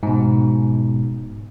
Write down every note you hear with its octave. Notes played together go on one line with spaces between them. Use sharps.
G#2 B2